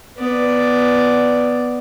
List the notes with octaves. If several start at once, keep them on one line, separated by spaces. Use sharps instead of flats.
B3 D5